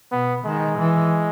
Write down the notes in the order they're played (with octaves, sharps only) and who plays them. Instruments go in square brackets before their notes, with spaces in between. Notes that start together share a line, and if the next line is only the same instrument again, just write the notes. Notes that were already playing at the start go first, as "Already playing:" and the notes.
[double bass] B2 [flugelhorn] B3
[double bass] D#3 [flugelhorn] G#3
[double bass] E3